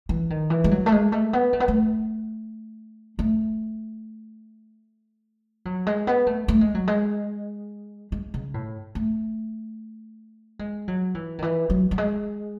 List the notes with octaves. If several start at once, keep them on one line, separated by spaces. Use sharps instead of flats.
E3
D#3
E3
G#3
F#3
A3
G#3
A3
B3
A3
B3
A3
A3
F#3
G#3
B3
A3
A3
G#3
F#3
G#3
G#3
C#3
A2
A3
G#3
F#3
E3
D#3
E3
F#3
F#3
G#3